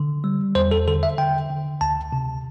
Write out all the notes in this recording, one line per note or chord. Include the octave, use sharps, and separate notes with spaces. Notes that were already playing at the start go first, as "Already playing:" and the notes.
Already playing: D3
G3
E2 C5
A4
D3 A4
E5
D3 G5
D3
D2 A5
C3